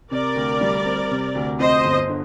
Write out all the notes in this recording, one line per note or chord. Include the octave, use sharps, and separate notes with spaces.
C3 A#4 D5
D2
G3
C4
C3
D2
F2 C5 D#5
G1
D3